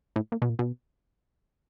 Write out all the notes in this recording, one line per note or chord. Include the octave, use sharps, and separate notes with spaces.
A2
A#2
B2
A#2
B2